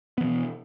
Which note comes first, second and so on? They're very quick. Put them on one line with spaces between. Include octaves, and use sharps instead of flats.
B3 E3 B2